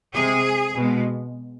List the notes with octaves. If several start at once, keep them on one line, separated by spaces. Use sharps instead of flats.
C3 G#3 G#4
B2 G#3